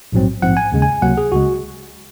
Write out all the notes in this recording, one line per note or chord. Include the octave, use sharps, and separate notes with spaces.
A#1 G#2 F#3 C4
A#1 G#2 F3 C4 F#5
G#5
D#2 C#3 G#3
G#5
C#2 C3 F#3 A#3 F#5
G#4
C#2 C#3 G#3 F#4